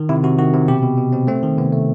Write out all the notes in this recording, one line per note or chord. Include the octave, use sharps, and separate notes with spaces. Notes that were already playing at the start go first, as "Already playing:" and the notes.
Already playing: D#3
C3 E4
C3 F#4
D#3 F#4
C3
B2 G4
B2
B2
B2 C4
A3 C4
D#3
C3 B3
A3